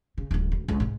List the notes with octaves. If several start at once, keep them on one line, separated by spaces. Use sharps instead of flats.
C#3
D1 C#2
D2
C#2 D3
G#2 C3